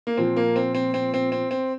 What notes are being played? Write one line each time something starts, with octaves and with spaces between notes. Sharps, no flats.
A#3
A#2 F3 C4
A#3
C4
C4
C4
C4
C4
C4